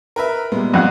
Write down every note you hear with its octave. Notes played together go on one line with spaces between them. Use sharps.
A#4 B4 E5
A#2 G3 G#3 B3
F2 F#5